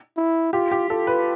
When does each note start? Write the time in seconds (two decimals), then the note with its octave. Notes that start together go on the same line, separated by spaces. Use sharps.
0.17 E4
0.53 F4 G4
0.71 G4
0.90 F4 A4
1.07 B4